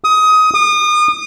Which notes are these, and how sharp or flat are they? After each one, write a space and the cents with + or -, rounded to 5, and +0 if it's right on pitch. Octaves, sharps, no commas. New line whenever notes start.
D#6 +20
D#6 -35